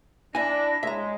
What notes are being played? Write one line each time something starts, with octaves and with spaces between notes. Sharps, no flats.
D4 E4 G#5 A#6
G#3 C#5 E5 A#5